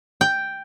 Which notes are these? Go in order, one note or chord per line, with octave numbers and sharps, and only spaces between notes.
G5